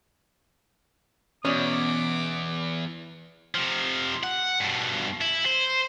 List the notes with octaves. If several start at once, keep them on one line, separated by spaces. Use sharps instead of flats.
E2 B2 C#4 D5 D6 D#6
C3 F3
F#5
G2 B2
E4
C5